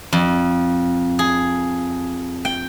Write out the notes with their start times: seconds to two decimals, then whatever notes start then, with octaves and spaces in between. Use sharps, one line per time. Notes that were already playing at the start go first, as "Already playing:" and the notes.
0.13 F2
1.19 G#4
2.45 G5